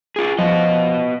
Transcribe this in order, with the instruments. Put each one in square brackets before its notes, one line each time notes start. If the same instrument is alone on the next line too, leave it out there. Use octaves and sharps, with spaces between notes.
[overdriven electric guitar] F4 G#4
[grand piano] F3 [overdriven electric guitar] B3 D#5